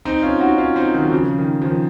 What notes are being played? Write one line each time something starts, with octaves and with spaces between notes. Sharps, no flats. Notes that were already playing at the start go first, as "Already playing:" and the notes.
C4 D#4
C#4 F4
D#4 F#4
C#4 F4
C4 D#4
D#3 F#3
F#3
C#3 F3
D#3
F3
D#3